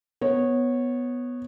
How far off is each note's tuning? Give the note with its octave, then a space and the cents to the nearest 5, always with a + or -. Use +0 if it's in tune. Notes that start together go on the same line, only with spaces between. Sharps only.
B3 +0 C#5 -15